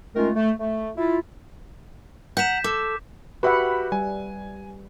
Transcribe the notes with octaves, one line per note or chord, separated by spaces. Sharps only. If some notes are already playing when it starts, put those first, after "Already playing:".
D#3 G#3 A3 C#4 F4 A#4
A3
A3
E4 F4
F#5 A#5 G6 B6 E7
A4 D6
F#4 G4 B4 E5 F#5 B5
G3 G#5